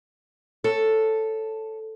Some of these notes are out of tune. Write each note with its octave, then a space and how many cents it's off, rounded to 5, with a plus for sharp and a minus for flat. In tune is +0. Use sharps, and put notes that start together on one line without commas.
A4 +0 C#5 -5